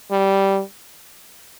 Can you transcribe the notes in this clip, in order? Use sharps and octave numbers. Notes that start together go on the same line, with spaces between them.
G3